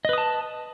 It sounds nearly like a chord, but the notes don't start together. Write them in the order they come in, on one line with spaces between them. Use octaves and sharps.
D#5 B4 D#6 A5